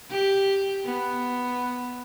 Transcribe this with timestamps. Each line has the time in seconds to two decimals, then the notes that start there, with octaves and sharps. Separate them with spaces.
0.10 G4
0.85 B3